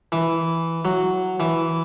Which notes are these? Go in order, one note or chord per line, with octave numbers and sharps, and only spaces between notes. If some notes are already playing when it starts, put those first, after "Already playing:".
E3
F#3
E3